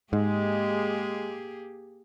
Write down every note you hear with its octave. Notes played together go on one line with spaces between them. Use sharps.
G#2 G#3 A#3 G4 G#4